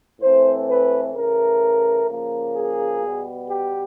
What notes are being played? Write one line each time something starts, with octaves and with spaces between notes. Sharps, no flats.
A2 E3 A3 C4 C5
B4
C#3 E3 A3 A#4
C#3 F3 A#3
G#4
B2 G3 B3
G4